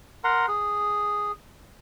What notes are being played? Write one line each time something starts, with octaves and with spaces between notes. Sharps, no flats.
A#4 F#5 A#5 C6
G#4